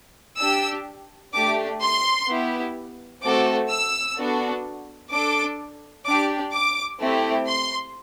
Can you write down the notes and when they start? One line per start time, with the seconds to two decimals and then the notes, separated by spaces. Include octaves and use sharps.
0.39 D4 G4 E6
1.34 A3 D4 G4 D6
1.81 C6
2.27 B3 E4 G4
3.22 A3 C4 F#4 A4 D6
3.69 E6
4.16 B3 D4 F#4 A4
5.10 D4 A4 D6
6.05 D4 G4 D6
6.53 D6
6.99 A3 C4 E4 G4
7.46 C6